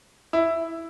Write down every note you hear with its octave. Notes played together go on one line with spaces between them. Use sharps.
E4